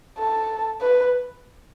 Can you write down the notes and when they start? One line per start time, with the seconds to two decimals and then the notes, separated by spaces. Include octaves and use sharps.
0.18 A4
0.81 B4